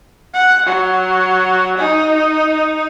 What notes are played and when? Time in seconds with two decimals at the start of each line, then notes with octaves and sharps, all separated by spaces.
0.34 F#5
0.66 F#3
1.78 D#4